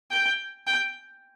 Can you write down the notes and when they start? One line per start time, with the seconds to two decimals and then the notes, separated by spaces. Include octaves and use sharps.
0.11 G5
0.67 G5